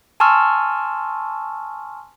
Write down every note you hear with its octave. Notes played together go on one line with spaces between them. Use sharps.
G#5 A5 C6 C#6 E6 F6